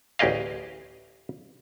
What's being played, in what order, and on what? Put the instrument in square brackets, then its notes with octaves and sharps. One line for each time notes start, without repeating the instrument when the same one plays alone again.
[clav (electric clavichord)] A1 D2 G4 G#4 D#5 F5